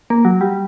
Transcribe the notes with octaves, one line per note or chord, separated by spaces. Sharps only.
A#3
F#3
G3